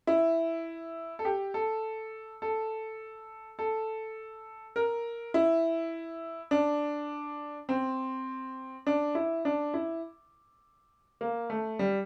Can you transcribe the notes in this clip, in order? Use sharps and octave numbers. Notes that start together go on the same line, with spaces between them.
E4
A4
G4
A4
A4
A4
A#4
E4
D4
C4
D4
E4
D4
E4
A#3
A3
G3